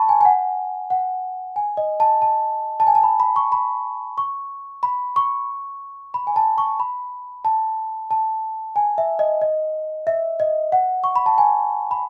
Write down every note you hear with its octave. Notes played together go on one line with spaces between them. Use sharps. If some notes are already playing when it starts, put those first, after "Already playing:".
Already playing: A5 B5 C#6
G#5
G#5
F#5
F#5
G#5
D#5
A5
A5
A5
G#5
A5
B5
B5
C#6
B5
C#6
B5
C#6
B5
G#5
A5
C#6
B5
A5
A5
G#5
E5
D#5
D#5
E5
D#5
F#5
C#6
B5
A5
G#5
B5